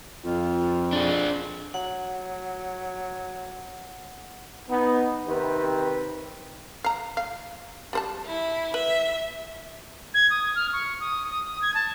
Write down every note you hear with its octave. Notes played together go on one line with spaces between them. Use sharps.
F2 F4
D4 G#4
F#3 F#5
B3 D#4
C3 D#3 C4 B4
F5 A#5
F5
G3 C5 A5
E4
B4 E5
G#6
D#6
F6
C#6
D#6
D#6
G#6
A5